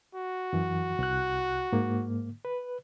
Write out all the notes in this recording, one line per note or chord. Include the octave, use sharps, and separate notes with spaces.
F#4
F#2 E3
C2 F#6
G#2 A#3
B4